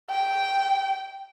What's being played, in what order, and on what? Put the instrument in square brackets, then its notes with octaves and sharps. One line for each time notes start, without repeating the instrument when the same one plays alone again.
[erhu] G5